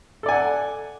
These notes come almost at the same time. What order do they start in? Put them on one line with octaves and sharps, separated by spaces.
A4 D5 G#5 F#5